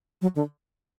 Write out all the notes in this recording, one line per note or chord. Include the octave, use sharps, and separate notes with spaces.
F#3
D3